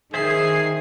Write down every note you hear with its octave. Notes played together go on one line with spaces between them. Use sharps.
D#3 G#4 C5 E5 G#5 C7